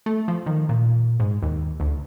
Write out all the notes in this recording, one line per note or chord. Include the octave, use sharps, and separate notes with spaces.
A3
F3
D#3
A#2
G#2
D#2
D2